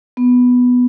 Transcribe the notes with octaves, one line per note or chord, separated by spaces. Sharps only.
B3